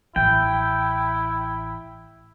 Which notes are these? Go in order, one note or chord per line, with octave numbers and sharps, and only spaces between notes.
A1 E4 G5